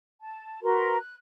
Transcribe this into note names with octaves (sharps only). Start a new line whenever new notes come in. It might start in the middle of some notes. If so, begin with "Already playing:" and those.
A5
F#4 A#4 B4 C6
F#6